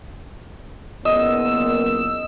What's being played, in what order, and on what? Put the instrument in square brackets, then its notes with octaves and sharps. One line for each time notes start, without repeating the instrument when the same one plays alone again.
[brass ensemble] F#1 A#2 B3 [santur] D#5 [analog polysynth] E6